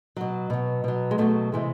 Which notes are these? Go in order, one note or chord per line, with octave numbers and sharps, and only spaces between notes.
B2 F#3
B2 F#3
B2 F#3
G#3
B2 F#3 A3
C3 E3 G#3